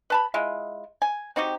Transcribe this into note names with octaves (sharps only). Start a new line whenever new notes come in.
B4 A5 B5
G#3 E4 F4
G#5
C4 D#4 F#4 G4